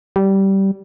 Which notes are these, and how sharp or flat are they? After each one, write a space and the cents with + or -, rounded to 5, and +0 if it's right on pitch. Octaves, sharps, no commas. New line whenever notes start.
G3 -15